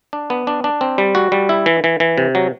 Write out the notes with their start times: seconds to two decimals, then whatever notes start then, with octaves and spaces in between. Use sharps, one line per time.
0.13 D4
0.30 B3
0.47 D4
0.64 D4
0.81 C4
0.98 G3
1.15 F#4
1.32 G3
1.49 E4
1.66 E3
1.84 E3
2.00 E3
2.18 C3
2.35 F#3